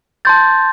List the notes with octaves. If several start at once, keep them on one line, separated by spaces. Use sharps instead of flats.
A5 C6 G6 A6